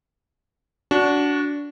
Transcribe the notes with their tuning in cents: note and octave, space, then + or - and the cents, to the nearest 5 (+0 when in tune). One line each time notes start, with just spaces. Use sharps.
D4 -20 F#4 +0